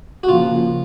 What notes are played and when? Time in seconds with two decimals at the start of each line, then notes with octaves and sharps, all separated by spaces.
0.23 F#4
0.28 C#3 F3 A#3 F4